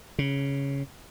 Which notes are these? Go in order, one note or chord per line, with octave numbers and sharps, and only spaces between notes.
C#3